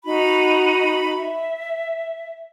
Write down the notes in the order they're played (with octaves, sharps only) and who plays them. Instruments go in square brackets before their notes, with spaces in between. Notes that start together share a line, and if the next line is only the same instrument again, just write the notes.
[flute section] D#4 F#4 B5
E5